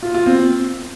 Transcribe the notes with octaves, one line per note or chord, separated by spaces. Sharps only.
F4
F4
C4